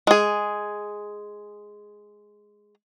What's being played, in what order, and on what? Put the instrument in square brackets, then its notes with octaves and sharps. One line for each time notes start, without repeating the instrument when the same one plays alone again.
[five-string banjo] G#3 G#4